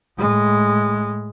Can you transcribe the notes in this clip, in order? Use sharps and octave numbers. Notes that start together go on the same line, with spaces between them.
A2 G#3